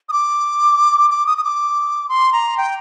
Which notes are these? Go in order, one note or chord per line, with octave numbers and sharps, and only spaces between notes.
D#6
D6
D6
D#6
D#6
D6
C6
A#5
G5